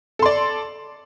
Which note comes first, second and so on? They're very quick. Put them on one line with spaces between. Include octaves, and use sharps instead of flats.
A4 C6 D5